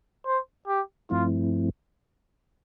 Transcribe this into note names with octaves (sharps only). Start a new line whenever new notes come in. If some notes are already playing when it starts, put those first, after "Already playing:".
C5
G4
G2 F3 A3 C4 E4 F4